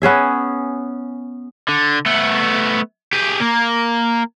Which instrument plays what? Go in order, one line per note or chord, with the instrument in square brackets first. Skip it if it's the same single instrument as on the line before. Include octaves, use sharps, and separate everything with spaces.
[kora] B3 C#4 G#4 E5
[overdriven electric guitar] D3
A3 B3
G4 G#4
A#3